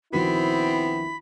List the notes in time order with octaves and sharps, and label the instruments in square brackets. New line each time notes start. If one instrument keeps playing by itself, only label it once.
[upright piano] A#1 D#3 F#4 [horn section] B3 C4 [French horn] E4 [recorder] B5